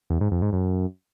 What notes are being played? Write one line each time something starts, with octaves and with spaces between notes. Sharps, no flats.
E2
G#2
F2
G#2
F#2